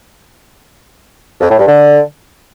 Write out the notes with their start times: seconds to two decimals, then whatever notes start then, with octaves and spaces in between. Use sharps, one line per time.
1.40 F2
1.49 A2
1.58 G2
1.67 D3